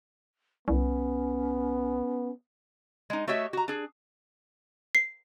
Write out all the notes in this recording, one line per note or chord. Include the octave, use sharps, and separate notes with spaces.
C2 B3 C#4
G#3 D#4
A3 F#4 G4 C#5 D#5 E5
F#4 A#5
D4 G#4
C7